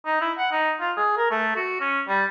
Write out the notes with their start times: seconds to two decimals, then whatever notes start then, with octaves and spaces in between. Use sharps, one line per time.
0.06 D#4
0.21 E4
0.38 F#5
0.52 D#4
0.81 F4
0.97 G#4
1.17 A#4
1.31 A3
1.56 F#4
1.81 C#4
2.08 G3